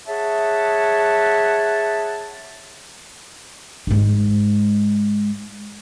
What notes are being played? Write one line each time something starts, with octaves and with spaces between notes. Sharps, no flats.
G#4 C#5 E5 F#5 A5
G#2 G#3